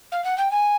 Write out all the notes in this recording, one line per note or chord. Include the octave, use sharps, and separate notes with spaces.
F5
F#5
G5
G#5